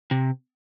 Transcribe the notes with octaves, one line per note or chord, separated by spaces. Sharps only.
C3